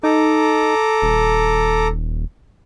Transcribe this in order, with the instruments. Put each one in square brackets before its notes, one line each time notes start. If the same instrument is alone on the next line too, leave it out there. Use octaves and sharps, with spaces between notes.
[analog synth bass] D#4 [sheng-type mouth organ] A4 A#5 D6
[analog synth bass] D#1